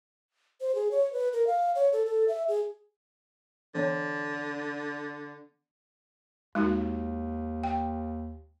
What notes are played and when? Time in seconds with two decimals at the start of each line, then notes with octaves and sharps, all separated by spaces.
0.61 C5
0.75 G#4
0.91 C#5
1.13 B4
1.33 A#4
1.47 F5
1.75 C#5
1.93 A4
2.06 A4
2.28 E5
2.48 G#4
3.75 D3 E3 B3 C#5
6.55 D#2 G#3 D#4 F#4
7.64 G5